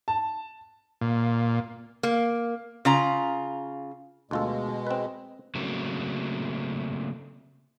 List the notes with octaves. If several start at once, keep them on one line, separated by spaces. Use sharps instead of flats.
A5
A#2
A#3
C#3 F4 A#5
D2 B2 G#3 F4 A4
C4 B4
C#3 F#3 A3 A#3 C4